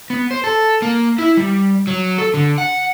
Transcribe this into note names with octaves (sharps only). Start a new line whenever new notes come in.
B3
C5
A4
A#3
E4
G3
F#3
A4
D3
F#5